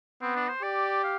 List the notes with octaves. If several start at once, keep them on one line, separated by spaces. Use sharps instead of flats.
B3 C4
D4
C5
G4 D5
F5